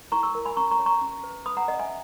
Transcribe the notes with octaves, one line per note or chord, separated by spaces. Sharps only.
E4 A#5 C#6
C#6 E6
A#4
G#5 B5
C#4 A#5 C#6
A#5 C#6
C#5
A#5 C#6
C#4
B4
B4 B5 D#6
F#5 A#5
C#4 D#5 F#5
E5 G#5